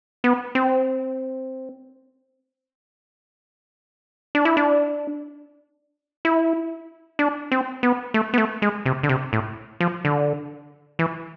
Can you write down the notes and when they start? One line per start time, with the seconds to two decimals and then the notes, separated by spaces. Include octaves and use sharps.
0.24 B3
0.55 C4
4.35 D4
4.45 E4
4.57 D4
6.25 E4
7.19 D4
7.52 C4
7.83 B3
8.14 A3
8.34 B3
8.38 A3
8.62 G#3
8.86 C3
9.03 D3
9.09 C3
9.33 A2
9.80 F3
10.05 D3
10.99 E3